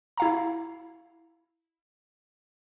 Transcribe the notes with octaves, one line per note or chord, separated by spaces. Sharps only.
E4 F5 A#5